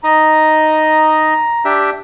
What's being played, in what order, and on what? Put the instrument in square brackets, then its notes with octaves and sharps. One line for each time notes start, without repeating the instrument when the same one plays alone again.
[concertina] D#4 D#5 [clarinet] A#5
[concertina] D4 G4 E5